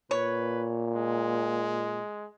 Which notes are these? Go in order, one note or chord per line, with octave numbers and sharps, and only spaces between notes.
A#2 B4 C#5
G#3